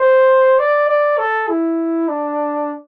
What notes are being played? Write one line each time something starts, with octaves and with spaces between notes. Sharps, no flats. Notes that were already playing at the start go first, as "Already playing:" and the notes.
Already playing: C5
D5
D5
A4
E4
D4